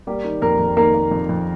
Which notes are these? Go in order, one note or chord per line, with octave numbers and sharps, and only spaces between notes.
G3 A#3 G4
D#3
F2 A#3 A#4
F2
D#3 A#3 A#4
A#3
F2
F2